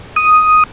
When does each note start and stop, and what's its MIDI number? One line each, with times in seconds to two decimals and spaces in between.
0.16 0.64 87